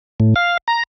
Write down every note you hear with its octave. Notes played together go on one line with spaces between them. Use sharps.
A2
F5
A#5